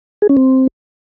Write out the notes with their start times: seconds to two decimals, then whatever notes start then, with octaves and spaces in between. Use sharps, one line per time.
0.22 G#4
0.29 C#4
0.37 C4